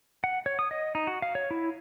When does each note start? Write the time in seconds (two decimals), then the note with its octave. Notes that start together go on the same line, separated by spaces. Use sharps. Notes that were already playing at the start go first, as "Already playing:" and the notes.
0.24 F#5
0.46 C#5
0.59 D#6
0.71 D#5
0.95 D#4
1.07 F#4
1.22 F5
1.35 C#5
1.51 E4